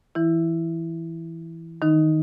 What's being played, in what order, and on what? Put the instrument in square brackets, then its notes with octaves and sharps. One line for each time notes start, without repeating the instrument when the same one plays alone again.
[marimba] E3 E4
D#3 D#4